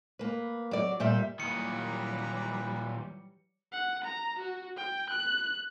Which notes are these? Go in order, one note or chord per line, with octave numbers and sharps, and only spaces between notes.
A#3 B4
F#3 D5
A#2 G3 G4 E5
A#2 D#3 E3 F#3 G3 B4 A#5 C#7
F#5
A#5
F#4
G5
F#6